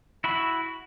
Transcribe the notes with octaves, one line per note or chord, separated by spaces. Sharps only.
E4 F#4 B5